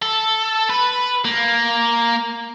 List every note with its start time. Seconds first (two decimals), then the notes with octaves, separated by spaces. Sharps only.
0.02 A4
0.70 B4
1.25 A#3